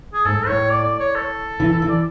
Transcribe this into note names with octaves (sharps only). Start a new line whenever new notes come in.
G#4
G#2 A4
A2 C#5
D5
D5
C#5
A4
E3
E3
D5